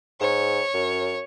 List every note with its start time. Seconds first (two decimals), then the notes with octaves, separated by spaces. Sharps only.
0.21 G#2 C#5
0.74 F#2